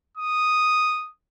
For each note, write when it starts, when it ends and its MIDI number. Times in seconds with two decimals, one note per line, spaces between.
0.17 1.10 87